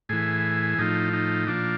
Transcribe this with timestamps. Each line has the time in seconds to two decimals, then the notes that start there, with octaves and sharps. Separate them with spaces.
0.09 A2 E3 G#4
0.78 A2 F3 D#4
1.13 D#4
1.47 A#2 F3 D4